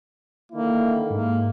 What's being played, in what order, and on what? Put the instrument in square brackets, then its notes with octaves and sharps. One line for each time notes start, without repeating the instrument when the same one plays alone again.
[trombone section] D3 D#3 E4 [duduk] A#3
[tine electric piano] G#2 [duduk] A#3